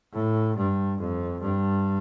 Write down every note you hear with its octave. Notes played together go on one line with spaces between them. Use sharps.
A2
G2
F2
G2